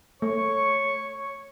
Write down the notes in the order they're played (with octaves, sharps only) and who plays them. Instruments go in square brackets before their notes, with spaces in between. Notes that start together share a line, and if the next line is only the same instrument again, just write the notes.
[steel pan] A3 [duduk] C#5 [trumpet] C#6